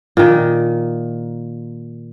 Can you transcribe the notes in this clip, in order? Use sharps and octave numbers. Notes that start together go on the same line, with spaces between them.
A#2 D#3